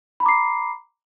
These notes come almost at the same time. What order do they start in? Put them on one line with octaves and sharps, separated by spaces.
B5 A#5 D6 C7